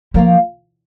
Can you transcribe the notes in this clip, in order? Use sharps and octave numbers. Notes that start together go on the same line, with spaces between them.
F3 A#3 F4 A#4 F5